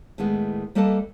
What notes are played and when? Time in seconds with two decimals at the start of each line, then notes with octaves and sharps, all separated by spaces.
0.18 A2 D#3 G#3 B3
0.75 G3 A#3 A4 B4 D#5 A5